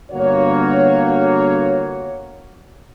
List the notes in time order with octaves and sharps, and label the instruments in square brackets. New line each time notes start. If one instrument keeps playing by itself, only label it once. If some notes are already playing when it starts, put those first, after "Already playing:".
[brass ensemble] G1 A#3 F#4 C#5